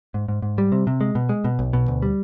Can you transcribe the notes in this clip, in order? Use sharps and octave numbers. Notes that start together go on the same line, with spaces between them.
G#2
G#2
G#2
G3
C3
C3
G#3
B2
G#3
B2
B1
B2
D2
G3